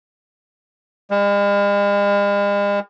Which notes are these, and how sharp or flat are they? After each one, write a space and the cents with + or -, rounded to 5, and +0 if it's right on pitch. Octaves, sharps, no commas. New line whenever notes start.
G#3 -45